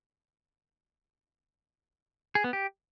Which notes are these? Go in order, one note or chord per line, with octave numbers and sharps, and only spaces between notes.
G#4
B3
G4